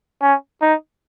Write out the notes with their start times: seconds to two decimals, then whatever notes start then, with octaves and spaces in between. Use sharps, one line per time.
0.22 C#4
0.62 D#4